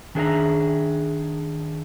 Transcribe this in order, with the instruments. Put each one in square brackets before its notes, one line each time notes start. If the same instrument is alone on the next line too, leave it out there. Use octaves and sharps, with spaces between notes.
[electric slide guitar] D#3 D4 G#4 A#4 E5 A#5